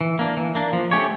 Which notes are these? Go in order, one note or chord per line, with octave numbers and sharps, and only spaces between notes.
E3
A#3 D4
E3
A#3 D4
F3
A3 C#4 G4 C#5